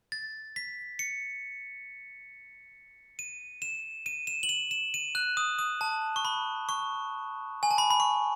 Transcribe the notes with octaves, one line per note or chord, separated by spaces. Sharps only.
A6
B6
C#7
D#7
E7
D#7
E7
F#7
E7
E7
D#7
F#6
D#6
D#6
A5
C#6
B5
C#6
G#5
A5
B5
B5
C#6